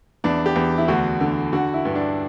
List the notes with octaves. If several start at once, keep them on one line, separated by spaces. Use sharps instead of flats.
E2 D4
G4
E2
E4
D2 F#4
D3
D3 F#4
E4
G2
D4